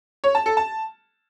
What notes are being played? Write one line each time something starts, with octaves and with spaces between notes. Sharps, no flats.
C#5
A5
A4
A5